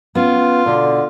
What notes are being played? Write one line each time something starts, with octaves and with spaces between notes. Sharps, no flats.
B3 C#4 F4
B2 D3